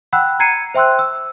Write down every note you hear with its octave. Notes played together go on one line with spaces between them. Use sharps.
F#5 G5 B5 E6 F#6
A#5 G#6 C7 C#7 D#7
C5 E5 G5 C6 E6 F#6
E6